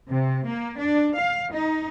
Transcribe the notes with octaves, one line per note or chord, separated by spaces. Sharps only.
C3
A#3
D4
F5
D#4